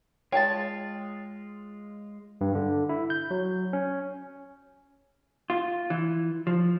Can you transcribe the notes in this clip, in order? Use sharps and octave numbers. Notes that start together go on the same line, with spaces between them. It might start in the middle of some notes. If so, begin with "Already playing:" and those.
G#3 F4 C#5 G5 A5 A6
G2
D3
E4
G6
F#3
C#4
F4
E3
F3